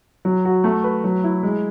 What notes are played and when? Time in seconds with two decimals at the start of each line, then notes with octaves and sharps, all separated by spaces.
0.25 F#3
0.45 F#4
0.64 A3
0.84 B4
1.04 F#3
1.24 E4
1.43 G#3